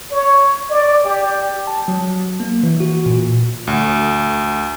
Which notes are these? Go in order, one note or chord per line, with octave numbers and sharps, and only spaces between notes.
C#5
D5
G4
A5
F#3
A#3
E3
F#4
A#2
D2